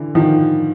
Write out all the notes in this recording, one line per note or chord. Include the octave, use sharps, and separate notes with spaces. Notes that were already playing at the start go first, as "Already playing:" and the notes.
Already playing: D3 E3
D#3 F3